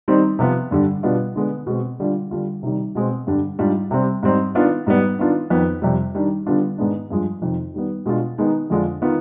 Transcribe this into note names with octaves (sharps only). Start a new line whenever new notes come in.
D#3 G3 C4 D#4
C3 F3 B3 F4
G2 D3 G3 D4
B2 G3 B3 D4 F4
D3 G#3 B3
B2 G#3 C4
D3 G3 D4 F4
D3 G3 D4 F4
C3 D#3 G3
B2 G#3 C4
G2 D3 G3 D4
G#2 G3 D4 F4
C3 G3 C4
G#2 G3 C4 D#4
D#3 B3 D4 F4
G#2 G3 B3
D#3 B3 D4 F4
F2 D#3 B3
F2 C3 G3
D#3 G3 D4
D3 G3 B3 D4 F4
G#2 D#3 G#3 B3 D4
G2 F3 G#3
F2 C3 D#3
D#3 G3 B3
B2 G#3 D4 F4
D#3 G#3 B3 D#4
F2 D3 G#3 D4 F4
D#3 B3 F4